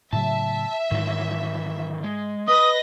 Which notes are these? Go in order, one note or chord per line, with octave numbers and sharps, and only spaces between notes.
A2 C#3 F#3 E5 A5
G#2 D#3 E3 F#3
G#3
B4 D#5 D#6 A#6